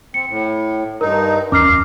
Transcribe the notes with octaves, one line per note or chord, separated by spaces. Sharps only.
C4 C#7
A2
G2 D#4 A#4
D1 E2 C#4 A#5 D6 F6 C7